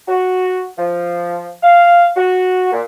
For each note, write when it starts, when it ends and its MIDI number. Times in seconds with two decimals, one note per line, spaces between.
0.08 0.65 66
0.78 1.51 53
1.63 2.08 77
2.16 2.70 66
2.72 2.81 46